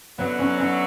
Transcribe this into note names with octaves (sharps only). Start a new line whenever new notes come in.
F#2 D3 F#3 B3
C#4
C#4